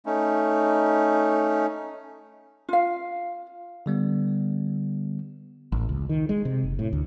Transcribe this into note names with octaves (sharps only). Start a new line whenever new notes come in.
A3 C#4 D#4
F4 F5
D3 G3 B3
A1
C#2
D#3
G#3
C3
F#1
A2
D2